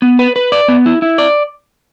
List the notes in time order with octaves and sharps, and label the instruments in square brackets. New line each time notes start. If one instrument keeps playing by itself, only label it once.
[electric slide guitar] B3
B4
B4
D5
B3
E4
E4
D5